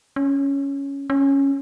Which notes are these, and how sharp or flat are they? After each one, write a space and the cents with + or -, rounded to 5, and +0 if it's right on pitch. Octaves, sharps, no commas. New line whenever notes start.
C#4 +5
C#4 -5